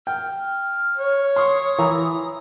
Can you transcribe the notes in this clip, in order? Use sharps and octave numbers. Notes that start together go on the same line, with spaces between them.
G5 F6
C#5
C6 C#6 D#6
E3 A#5